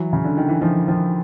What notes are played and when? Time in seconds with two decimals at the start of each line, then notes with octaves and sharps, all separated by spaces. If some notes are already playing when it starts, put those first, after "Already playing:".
Already playing: E3 F#3
0.13 C#3
0.24 D3
0.37 D#3
0.49 E3
0.61 D#3 F3
0.88 D#3 F3